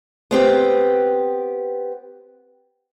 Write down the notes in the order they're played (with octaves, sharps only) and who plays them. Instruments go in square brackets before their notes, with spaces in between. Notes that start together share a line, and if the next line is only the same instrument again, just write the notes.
[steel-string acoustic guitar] B3 C4 G4